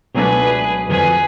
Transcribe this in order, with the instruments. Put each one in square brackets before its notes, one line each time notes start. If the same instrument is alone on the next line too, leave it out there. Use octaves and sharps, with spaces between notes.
[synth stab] C#2 B2 F#3 A3 D4 [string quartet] G#4 B4
[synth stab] F2 D3 F3 [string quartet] G#4 B4